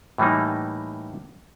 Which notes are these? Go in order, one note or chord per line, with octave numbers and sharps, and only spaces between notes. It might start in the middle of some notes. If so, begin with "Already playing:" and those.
A2 E3 G3 A#3 D#4